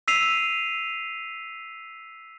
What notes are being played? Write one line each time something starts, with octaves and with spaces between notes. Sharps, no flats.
E6 B6 C7 D#7 F7